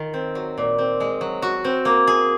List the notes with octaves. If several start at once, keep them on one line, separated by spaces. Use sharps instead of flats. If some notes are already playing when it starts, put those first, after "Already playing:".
Already playing: D#3 F4
C4
F#3
A#2
C4
G#3
F#3
F#4
C4
A#3
G#4